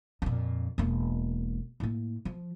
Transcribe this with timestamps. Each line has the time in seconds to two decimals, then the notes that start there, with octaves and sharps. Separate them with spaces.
0.22 F2 A#2
0.78 E1 A#3
1.80 A2 A#3
2.25 F3